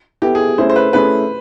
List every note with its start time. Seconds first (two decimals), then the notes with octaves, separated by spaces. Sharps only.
0.22 B3 E4 G4 A4
0.35 G#4
0.58 A3 C#4 E4 G#4 C5
0.70 C5
0.76 B4
0.93 A3 C#4 E4 G#4 B4